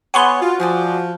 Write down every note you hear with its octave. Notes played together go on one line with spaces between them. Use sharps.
B3 G#4 C#5 F#5 B5 C6 D6
F4 F#4
F3 G#4 C5 D5